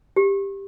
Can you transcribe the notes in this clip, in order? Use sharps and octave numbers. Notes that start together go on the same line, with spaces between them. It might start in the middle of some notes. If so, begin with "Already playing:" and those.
G4